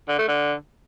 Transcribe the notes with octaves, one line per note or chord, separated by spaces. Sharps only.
D3
A3
D3